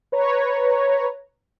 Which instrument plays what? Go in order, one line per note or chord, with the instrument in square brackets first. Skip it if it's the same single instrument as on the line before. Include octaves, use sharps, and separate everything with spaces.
[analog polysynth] B4 C#5 A#5